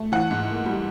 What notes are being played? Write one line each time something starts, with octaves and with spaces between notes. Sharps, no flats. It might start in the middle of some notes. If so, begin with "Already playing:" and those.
Already playing: A3
E3 F#5
G#2
A#3
G3